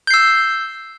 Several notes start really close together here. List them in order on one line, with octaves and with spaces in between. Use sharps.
G6 C7 E6